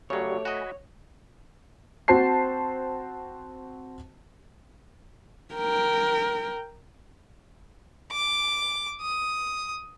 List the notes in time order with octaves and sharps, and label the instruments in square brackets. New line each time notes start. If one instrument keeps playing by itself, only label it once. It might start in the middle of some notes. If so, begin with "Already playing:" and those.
[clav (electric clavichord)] C#3 F#3 [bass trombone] A3 [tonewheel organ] F#4 G4 D5 [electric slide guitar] C#5
[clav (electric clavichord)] F#4 D#5 [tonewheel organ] G#5 B5
[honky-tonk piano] C4 F#4 C5 A5 C7
[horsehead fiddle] A#4 G5
[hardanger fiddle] D6
D#6